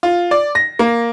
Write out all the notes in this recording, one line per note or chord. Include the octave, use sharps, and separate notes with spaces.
F4
D5
A#6
A#3